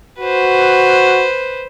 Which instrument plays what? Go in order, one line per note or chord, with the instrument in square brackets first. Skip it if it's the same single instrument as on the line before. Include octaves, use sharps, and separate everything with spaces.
[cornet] F#4 [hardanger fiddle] B4 C5